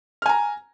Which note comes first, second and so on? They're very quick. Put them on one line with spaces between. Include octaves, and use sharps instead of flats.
F6 G#5 A#5